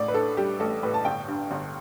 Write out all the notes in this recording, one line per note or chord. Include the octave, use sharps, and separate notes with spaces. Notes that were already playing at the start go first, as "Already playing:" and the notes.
Already playing: A1 A2 D5
B4
D4 A4
G3 G4
A1 A4
A2 B4
A5
G1 G5
G2
G1